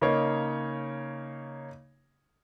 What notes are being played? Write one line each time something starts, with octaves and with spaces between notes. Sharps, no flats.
C#3 A#3 D#4 C#5